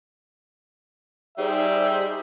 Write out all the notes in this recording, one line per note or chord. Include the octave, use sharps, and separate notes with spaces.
G3 D#4 G4 G#4 C5 E5